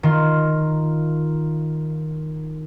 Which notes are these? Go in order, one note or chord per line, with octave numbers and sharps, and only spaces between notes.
D#3 F4